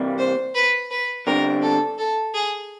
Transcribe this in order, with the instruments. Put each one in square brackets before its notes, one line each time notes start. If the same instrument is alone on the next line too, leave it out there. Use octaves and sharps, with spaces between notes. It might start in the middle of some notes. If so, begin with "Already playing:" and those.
Already playing: [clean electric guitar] C3 E3 G3 A#3
[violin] C5
B4
B4
[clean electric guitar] D3 G3 C4 [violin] A#4
[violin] A4
A4
G#4